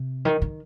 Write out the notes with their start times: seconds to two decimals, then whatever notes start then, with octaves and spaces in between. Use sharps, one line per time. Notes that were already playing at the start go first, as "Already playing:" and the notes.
Already playing: C3
0.25 D#3
0.42 D#3